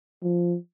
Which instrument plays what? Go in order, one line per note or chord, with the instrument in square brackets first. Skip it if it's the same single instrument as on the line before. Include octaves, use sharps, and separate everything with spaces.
[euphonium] F3